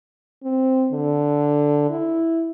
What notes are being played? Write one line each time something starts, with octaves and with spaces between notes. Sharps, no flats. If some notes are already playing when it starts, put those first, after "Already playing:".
C4
D3
E4